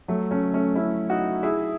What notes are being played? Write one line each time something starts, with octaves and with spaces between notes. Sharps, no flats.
F#3 A3
A3 C#4
A3 C#4
C#4 E4
D#4 F#4
E4 G#4